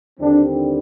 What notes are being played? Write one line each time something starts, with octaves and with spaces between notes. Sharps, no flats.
D#2 D3 G3 C4 D4